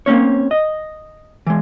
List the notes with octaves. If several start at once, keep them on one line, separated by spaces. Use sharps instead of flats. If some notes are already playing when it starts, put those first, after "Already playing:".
A#3 C4 C#4 C#5
D#5
E3 G#3